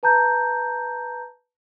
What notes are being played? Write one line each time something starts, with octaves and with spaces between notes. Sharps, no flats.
B4 A5 A#5 G6